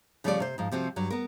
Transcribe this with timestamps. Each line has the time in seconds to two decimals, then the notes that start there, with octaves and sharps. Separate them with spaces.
0.24 C#3 F3 G3 A3 C#4 D5
0.40 C3 C5
0.58 G#2 F3
0.71 C3 F3 C4 F#4
0.96 G2 F#3
1.10 B3 A#4